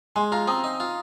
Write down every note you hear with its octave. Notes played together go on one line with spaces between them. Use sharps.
G#3 G#5 C6
F4 F5 A#5
C4 A#5 D#6
D#4
F4